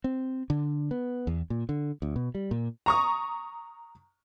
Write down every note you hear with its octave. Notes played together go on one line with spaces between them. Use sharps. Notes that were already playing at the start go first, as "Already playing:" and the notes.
C4
D3
B3
E2
A#2
D3
D2
B2
G3
A#2
A#5 C#6 D#6